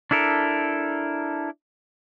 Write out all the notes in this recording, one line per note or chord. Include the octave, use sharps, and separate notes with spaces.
D4 E4 A4 A#4